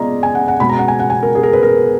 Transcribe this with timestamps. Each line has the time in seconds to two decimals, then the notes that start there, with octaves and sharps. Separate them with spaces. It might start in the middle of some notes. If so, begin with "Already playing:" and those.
Already playing: G#3 B3 F4 G#4 D5 D#5 A#5
0.23 G#5
0.35 F#5
0.48 F#5
0.60 B2 G#3 B3 B5
0.69 A#5
0.79 F#5
0.88 G#5
1.00 F#5
1.10 G#5
1.23 A#4
1.35 G#4
1.43 A#4
1.53 B4
1.63 A#4